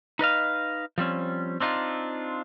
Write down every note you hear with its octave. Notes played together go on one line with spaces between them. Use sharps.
D#4 B4 D#5 F5
F3 G3 C4 C#4
C4 D4 D#4 F4